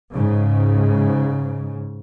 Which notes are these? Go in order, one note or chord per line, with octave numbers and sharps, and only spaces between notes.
G#2 C#3